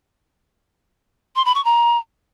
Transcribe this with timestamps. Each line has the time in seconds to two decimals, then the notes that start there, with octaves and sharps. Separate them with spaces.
1.36 C6
1.45 B5
1.55 C#6
1.64 A#5